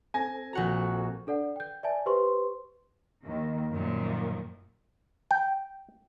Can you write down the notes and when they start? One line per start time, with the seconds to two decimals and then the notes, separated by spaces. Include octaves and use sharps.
0.14 C4 A4 G#5 A#6
0.53 A#1 F#4 F#5 A#5
1.27 D4 A4 D5 F#5
1.56 G5 G6
1.83 D5 E5 G#5 A5
2.06 G4 B4 C5 C6 C#6
3.24 D#2 D#3
3.72 F#2 A#2 D#3 F3
5.31 G5